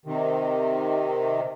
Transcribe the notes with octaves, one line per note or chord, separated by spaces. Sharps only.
C3 D#3